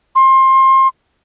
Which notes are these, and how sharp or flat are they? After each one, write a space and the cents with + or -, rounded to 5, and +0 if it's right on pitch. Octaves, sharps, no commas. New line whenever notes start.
C6 +25